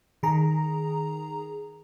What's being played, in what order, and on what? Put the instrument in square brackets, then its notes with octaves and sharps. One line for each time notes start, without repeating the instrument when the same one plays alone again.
[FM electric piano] D#3 G#4 A#5